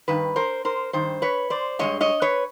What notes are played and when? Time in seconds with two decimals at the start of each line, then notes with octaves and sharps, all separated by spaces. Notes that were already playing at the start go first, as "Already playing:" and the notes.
0.08 G2 D#3 B4
0.36 A#4 C5
0.65 A#4 C5
0.93 G2 D#3 C5
1.22 B4 C#5
1.50 C5 D5
1.79 G2 D#3 G#3 C#5 D#5
2.01 C#5 D#5
2.22 B4 C#5